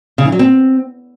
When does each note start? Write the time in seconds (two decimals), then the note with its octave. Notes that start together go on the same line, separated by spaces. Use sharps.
0.18 C#3
0.25 E3
0.32 F#3
0.39 C4